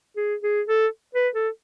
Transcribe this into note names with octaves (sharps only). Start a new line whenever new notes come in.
G#4
G#4
A4
B4
A4